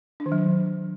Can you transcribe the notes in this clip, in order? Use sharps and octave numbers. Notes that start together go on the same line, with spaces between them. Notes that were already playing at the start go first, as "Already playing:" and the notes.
D4
D#3
F#3